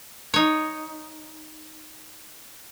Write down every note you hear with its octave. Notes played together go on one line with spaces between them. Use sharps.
D#4 C#5